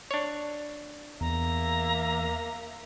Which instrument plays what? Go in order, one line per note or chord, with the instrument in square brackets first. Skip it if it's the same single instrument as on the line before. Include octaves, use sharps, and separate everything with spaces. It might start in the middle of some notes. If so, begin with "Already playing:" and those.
[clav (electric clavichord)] D4 C#5
[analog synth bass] E2 [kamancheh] A#3 E5 [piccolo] A#5